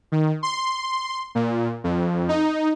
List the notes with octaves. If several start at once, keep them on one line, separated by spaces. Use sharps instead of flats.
D#3
C6
A#2
F2
D#4